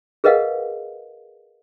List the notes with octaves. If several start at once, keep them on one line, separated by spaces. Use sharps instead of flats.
G#4 A#4 B4 D#5 F5 F#5